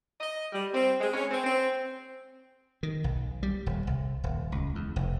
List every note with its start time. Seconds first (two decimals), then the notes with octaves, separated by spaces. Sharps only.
0.20 D#5
0.53 G3
0.74 C4
1.00 G#3
1.14 C#4
1.31 C4
1.44 C4
2.83 D#3
3.04 B1
3.43 G3
3.66 D#1
3.87 C2
4.24 D#1
4.52 C#2
4.75 E2
4.96 F1